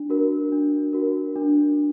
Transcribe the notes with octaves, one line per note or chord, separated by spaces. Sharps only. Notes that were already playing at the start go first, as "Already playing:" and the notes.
Already playing: D4
F#4 A#4
D4
F#4 A#4
D4